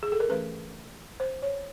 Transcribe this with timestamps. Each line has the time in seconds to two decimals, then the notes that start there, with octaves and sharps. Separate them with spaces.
0.03 G#4
0.12 A4
0.20 A#4
0.29 E3 A3 C#4 B4
1.20 C5
1.42 C#5